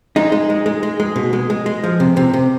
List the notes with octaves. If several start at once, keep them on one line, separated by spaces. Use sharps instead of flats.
G#3 D#4
G#3
G#3
G#3
G#3
G#3
B2
G#3
G#3
G#3
F3
C3
C3
C3